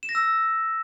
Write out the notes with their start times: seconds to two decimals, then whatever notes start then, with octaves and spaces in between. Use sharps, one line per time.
0.03 E7
0.09 A#6
0.15 E6